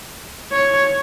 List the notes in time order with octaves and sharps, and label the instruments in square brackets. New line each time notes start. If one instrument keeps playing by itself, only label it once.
[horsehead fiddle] C#5